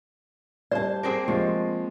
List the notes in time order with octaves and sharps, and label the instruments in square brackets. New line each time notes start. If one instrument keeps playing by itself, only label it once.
[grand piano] G3 [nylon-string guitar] C5 A5 [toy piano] D5
[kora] A#3 C4 G#4
[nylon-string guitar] F3 [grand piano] G#3 [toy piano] G4